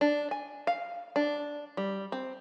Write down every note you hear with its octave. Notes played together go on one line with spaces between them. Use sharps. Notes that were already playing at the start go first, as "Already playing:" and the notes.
D4
G#5
F5
D4
G3
C4